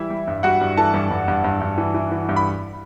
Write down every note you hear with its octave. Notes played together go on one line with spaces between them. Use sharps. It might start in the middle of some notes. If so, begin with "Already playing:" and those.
Already playing: E3 G3 E4 E5
G3
G2
G3 F#4 F#5
G2
E3 A4 A5
G2
G2
G2
G2
G2
E3
E3
E3
G2
B5